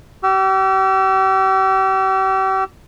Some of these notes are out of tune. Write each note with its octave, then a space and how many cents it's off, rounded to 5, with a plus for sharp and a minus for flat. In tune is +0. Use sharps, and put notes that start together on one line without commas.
G4 -40 E6 +30